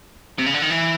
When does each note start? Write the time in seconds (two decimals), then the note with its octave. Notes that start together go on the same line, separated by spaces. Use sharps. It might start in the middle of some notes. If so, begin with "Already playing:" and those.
0.38 C3
0.46 C#3
0.54 D3
0.62 D#3
0.70 E3